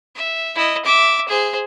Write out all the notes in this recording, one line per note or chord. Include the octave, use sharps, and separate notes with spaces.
E5
E4 D#5
E5 D6
G#4 C5